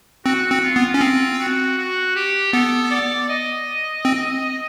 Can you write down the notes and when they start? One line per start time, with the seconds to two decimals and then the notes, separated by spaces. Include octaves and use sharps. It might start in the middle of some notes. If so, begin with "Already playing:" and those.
0.25 C4 F#4
0.51 C4
0.64 F4
0.76 B3
0.94 C#4
1.01 C4 F4
1.39 F#4
1.77 F#4
2.15 G4
2.53 B3 A4
2.91 D5
3.29 D#5
4.05 C4